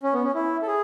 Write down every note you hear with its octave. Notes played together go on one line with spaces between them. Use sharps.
C#4
B3
C#4
E4
A4
G#4